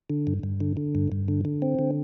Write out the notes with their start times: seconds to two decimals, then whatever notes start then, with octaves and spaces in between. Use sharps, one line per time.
0.10 D3
0.27 G2
0.43 G2
0.60 D3
0.77 D3
0.95 G2
1.12 G2
1.28 D3
1.45 D3
1.62 C4
1.79 D3